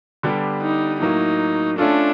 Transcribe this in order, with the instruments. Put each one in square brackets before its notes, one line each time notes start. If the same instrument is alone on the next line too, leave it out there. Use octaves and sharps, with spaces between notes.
[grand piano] D3 G3 B3 D4 G4
[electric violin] D#4
[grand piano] A2 F#3 A#3 [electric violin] D#4
[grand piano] A3 C#4 F4 A4 [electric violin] D4